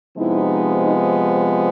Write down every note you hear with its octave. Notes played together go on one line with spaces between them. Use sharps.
C3 F3 G#3 B3 D#4 E4
D#4